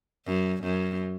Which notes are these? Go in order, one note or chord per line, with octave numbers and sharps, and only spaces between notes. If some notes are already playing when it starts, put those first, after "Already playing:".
F#2
F#2